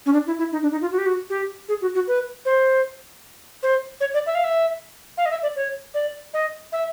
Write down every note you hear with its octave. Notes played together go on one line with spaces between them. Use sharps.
C#4
D4
E4
E4
D#4
D4
D#4
F4
F#4
G4
F#4
G4
G#4
F#4
F#4
B4
C5
C5
C#5
D5
E5
F5
E5
F5
D#5
E5
D5
C#5
D5
D#5
E5